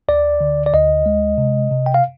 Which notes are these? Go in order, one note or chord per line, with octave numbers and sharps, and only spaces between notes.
D2 D5
D3
D5
D2 D#5
G#3
C3
C3
G5
F5